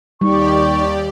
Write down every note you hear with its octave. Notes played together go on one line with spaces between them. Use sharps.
D#2 G3 D#4 G4 D5 C#6